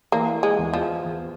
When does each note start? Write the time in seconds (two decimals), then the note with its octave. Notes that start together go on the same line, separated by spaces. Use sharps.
0.12 E3 A#3
0.43 G#3
0.58 E2
0.74 F3
1.04 E2